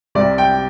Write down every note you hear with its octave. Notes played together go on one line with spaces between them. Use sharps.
C2 C3 G3 D5
G5